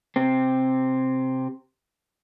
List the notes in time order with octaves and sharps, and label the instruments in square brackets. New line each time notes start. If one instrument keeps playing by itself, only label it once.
[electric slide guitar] C3 C4